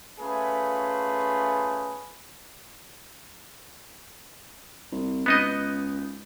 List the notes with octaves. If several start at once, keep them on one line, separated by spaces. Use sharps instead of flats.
A3 C#4 F4 G#4 B4
C2
C#2 B3 D#4 D#5